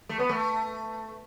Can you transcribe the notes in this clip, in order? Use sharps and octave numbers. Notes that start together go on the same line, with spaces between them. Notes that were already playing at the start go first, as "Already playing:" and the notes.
A3
B3
A3